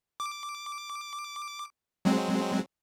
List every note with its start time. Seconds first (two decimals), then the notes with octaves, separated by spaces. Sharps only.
0.20 D6
2.05 F#3 G#3 C4